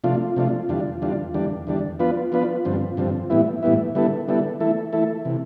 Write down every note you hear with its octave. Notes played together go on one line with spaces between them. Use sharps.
C3 F3 A3 D4 F4
C3 F3 A3 D4 F4
E2 D3 G3 D4 F4
E2 D3 G3 D4 F4
E2 D3 G3 D4
E2 D3 G3 D4
F3 B3 D4 F4 B4
F3 B3 D4 F4 B4
G2 D3 F3 C4
G2 D3 F3 C4
A2 E3 G3 B3 E4
A2 E3 G3 B3 E4
D3 G3 B3 E4 A4
D3 G3 B3 E4 A4
E3 A3 E4 A4
E3 A3 E4 A4
C3 E3